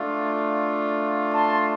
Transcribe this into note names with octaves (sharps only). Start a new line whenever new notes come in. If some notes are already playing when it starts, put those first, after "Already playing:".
Already playing: A3 D4 F4
A5 C6